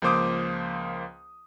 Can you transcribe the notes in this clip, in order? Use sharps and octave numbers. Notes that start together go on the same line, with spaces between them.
C#2 F3 A#3 C5 D6 D#6